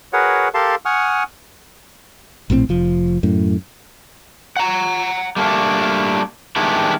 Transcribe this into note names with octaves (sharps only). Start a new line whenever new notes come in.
F#4 G#4 A#4 B4 C#5 F#5
G4 A4 A#4 F5 A5 C6
F#5 G#5 C#6 D#6 F6
A#1 A2 E3 C4
F1 F3
F#2 A2
F#5 A#5
G3 A3 A#3 D4
D#3 G3 G#3 B3 D4 E4